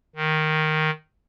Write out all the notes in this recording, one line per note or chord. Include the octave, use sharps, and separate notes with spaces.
D#3